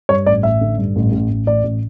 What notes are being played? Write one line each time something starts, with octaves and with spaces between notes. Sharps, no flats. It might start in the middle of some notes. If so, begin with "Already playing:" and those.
G2 C#5
A1 D5
A1 E5
D3
G2
A1
A1
A1
A1 D5
A1